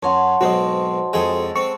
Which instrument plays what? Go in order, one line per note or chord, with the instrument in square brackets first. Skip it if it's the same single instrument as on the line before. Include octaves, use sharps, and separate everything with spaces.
[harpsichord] F#2 [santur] C#5 F#5 [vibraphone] A5 C6
[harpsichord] B1 G#2 C4 [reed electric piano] F#4 C5 D#5
[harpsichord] F2 G#4 G5 [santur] G#3 A4
[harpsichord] C4 [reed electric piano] C#6